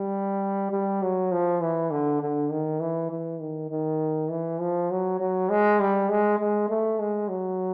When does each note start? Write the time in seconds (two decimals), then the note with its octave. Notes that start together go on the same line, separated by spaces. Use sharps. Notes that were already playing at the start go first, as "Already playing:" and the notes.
Already playing: G3
0.71 G3
1.02 F#3
1.32 F3
1.61 E3
1.91 D3
2.21 D3
2.51 D#3
2.80 E3
3.10 E3
3.41 D#3
3.70 D#3
4.30 E3
4.59 F3
4.90 F#3
5.20 F#3
5.50 G#3
5.80 G3
6.09 G#3
6.39 G#3
6.69 A3
6.99 G#3
7.29 F#3